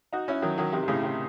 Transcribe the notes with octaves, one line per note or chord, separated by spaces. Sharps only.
D#4 F#4
C#4 E4
D#3 F#3
D#3 F#3
C3 D#3
C3
A2 C#3
C3